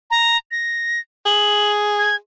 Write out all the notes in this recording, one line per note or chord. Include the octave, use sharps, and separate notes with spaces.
A#5
A#6
G#4 F#7
G#6